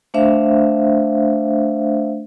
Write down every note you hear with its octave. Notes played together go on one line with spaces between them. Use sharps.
A3 D4 C5 E5 F5